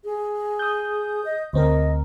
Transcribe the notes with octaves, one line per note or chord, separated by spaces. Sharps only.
G#4
D#6 G6
D#5
D2 C4 A#4 D#5